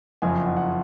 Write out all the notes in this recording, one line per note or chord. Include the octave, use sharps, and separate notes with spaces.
F#1 F2 F3 G#5
F#5
F#5